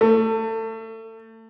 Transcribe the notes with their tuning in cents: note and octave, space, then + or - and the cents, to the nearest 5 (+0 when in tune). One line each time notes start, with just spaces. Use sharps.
A3 +30